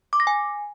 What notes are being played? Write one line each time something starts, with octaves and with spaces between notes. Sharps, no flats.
D6
A#6
G#5